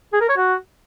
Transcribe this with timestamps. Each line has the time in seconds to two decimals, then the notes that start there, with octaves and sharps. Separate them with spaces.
0.13 G#4
0.21 A#4
0.29 C#5
0.37 F#4